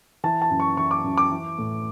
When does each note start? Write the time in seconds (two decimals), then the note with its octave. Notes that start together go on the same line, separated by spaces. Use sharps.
0.24 E3 A5
0.42 A5
0.50 F#2
0.60 C#6
0.77 E3 C#6
0.91 D6
1.04 F#2
1.18 D6
1.31 E3
1.58 A2